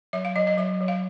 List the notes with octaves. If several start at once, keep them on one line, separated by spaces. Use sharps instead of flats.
F#3 E5
F5
F#3 D#5
D#5
F#3 E5
F#3
F5